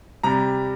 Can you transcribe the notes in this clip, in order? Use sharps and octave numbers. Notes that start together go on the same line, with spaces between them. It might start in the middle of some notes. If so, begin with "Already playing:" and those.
C3 G3 A#5